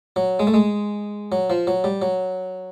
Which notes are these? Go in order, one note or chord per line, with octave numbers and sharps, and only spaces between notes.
F#3
G#3
A3
G#3
F#3
F3
F#3
G3
F#3